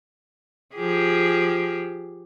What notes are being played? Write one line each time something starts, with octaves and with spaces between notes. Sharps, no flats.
F3 G4 G#4